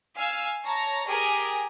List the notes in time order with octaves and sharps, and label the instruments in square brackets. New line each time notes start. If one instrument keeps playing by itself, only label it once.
[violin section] F5 G#5 E6
C#5 A5 A#5
G4 G#4 A#4 G#5